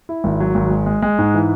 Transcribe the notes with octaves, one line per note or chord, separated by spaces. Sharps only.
E4
G#1
F#3
G#1
G#3
G#3
G#3
G#2
E3